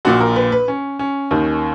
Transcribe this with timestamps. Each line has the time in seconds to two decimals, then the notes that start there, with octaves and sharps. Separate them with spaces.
0.05 A#1 A#2 F#4
0.20 A#4
0.36 B4
0.52 B4
0.68 C#4
0.99 C#4
1.31 D#2 D#3